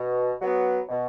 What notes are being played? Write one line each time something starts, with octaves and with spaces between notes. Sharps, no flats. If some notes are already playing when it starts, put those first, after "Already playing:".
Already playing: B2
F#3 B3
B2